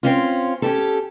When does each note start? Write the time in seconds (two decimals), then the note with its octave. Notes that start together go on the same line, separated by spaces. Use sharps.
0.03 C4 C#4 F4
0.62 C#4 G4 A4